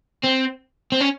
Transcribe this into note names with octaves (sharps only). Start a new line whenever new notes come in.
C4
C4
C#4